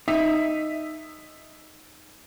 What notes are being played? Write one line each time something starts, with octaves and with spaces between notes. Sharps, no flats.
D#4 E5